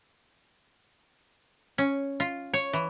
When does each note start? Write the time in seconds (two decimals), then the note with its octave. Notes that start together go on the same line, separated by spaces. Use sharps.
1.78 C#4
2.20 F4
2.53 C#5
2.73 E3